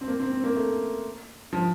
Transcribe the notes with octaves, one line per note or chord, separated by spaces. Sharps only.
C4
A#3
C4
C4
A#3
A3
F3